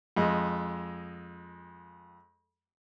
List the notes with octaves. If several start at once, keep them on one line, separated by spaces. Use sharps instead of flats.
F2 G#3